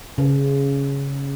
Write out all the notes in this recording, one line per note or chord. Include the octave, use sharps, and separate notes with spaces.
C#3